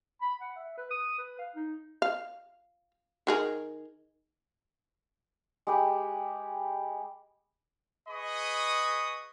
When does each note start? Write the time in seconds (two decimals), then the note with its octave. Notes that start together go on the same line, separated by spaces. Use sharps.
0.22 B5
0.41 F#5
0.56 E5
0.78 B4
0.91 D#6
1.18 B4
1.39 F5
1.56 D#4
2.02 F5
3.27 D#3 G#4 A#4
5.67 G#3 G4 B4
8.09 G#4 B4 D#5 B5 C#6 D#6